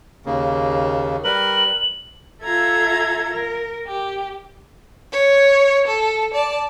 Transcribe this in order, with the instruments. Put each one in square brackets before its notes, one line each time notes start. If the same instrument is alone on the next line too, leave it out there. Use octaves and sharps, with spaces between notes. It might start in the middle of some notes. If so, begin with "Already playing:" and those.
[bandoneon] D#2 C#3 A#3
[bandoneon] G3 A#4 B4 [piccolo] F#7
[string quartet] F4 A4 E5 A#5 G#6
A#4
G4
[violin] C#5
A4
D5 A5